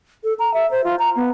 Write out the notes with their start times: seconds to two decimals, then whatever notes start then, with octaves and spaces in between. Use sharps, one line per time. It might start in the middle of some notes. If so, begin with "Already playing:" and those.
0.24 A4
0.39 A#5
0.54 E5
0.71 C5
0.84 F4
0.99 A#5
1.16 B3